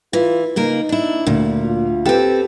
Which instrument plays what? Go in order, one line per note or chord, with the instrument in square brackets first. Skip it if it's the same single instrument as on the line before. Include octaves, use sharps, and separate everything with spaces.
[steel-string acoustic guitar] E3 [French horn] F4
[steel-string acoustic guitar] C#3 A#3 A#4 [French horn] D#4
[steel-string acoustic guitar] D4 E4
[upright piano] D2 [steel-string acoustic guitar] A#2
[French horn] F4
[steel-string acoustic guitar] C4 A4 [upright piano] G4 B4